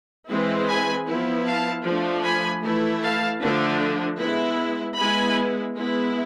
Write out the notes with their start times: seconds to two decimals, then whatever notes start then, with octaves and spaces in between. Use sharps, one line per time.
0.29 E3 G#3 C4 E4
0.68 G#5 B5
1.08 F3 B3 E4
1.46 F5 A5
1.85 F3 A3 D4
2.25 G#5 B5
2.63 E3 A3 E4
3.03 F5 A5
3.42 D3 F3 A3 D4
4.19 G#3 B3 E4
4.97 G#3 B3 E4 G#5 B5
5.75 G#3 B3 E4